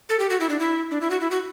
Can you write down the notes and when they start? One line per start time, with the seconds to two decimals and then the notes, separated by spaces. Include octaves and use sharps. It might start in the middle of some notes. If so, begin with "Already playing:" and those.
0.09 A4
0.20 G4
0.30 F#4
0.40 E4
0.49 D4
0.60 E4
0.91 D4
1.01 E4
1.10 F#4
1.21 E4
1.31 F#4